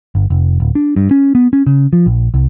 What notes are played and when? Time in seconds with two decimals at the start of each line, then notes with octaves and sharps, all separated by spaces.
0.15 G1
0.30 F1
0.60 D1
0.75 D4
0.96 G2
1.11 C#4
1.35 B3
1.53 C#4
1.67 C#3
1.93 F3
2.06 A#1
2.34 C2